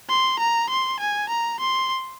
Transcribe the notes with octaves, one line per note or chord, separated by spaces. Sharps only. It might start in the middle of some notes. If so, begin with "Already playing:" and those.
C6
A#5
C6
G#5
A#5
C6